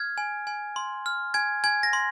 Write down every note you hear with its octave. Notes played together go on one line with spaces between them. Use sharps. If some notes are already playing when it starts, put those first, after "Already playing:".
Already playing: F6 G#6
G#5
G#5
C6
F6
G#5 G#6
G#5 G#6
A#6
C6